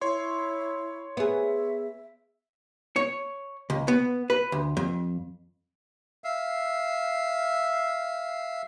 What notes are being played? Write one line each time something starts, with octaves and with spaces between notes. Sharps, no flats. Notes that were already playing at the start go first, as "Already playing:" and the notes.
E4 C#5 C6
B3 G#4 E5
C#5
C#2
B3
B4
D2
F2
E5 F5